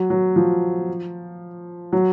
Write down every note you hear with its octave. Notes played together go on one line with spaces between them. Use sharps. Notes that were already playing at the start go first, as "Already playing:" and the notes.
Already playing: F#3
F#3
F3
F#3